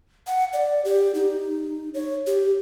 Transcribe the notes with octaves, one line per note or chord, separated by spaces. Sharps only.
F#5
D5
G4
D#4
C#5
G4